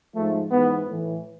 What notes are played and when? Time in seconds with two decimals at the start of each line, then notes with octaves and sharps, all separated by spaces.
0.15 G#2 F3 A3
0.50 G#2 E3 B3
0.87 A2 E3